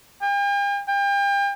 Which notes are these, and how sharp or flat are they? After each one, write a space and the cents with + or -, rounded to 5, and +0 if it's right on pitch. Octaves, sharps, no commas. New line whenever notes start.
G5 +45
G5 +35